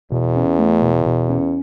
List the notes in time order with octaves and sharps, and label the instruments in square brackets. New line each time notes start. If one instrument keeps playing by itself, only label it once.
[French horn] E2 [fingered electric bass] B2
[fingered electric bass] C#4
A3
B2
B2
C#4